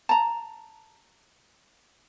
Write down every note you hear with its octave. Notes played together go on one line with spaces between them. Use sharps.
A5 A#5